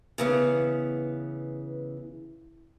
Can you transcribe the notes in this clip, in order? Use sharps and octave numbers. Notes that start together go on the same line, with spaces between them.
C#3 E3 B3